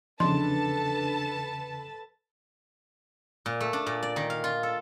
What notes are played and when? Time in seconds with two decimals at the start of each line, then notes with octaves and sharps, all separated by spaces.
0.20 E2 C#3 F3 D4 A4 B4 A5 C6
3.46 A#2
3.60 A3
3.73 D4
3.86 A#2
4.02 D5
4.16 D#3
4.30 F5
4.44 F4
4.63 A4